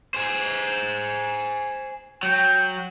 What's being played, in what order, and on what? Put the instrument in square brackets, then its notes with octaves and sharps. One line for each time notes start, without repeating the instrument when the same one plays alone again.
[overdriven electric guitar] G#4 C5
[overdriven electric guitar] F#3 [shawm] G5